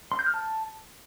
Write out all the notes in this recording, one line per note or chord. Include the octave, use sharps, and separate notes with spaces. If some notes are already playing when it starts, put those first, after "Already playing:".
C6
G6
F6
A5